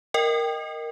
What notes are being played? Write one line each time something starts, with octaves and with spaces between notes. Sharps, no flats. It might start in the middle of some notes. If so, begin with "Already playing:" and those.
A#4 D#5 G5